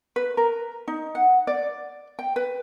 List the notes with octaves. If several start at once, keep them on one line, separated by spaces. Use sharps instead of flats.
B4
A#4
D#4
F#5
D5
G5
B4